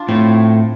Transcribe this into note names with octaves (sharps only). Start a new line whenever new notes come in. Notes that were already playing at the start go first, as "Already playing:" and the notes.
Already playing: D4 F4
A2 C4